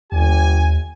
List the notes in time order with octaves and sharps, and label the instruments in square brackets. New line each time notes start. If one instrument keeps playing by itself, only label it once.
[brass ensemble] G1 G4 G#5 [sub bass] D#2